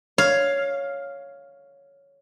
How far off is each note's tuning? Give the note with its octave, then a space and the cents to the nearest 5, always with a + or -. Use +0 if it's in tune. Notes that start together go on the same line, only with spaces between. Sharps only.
C#5 +5 F5 +0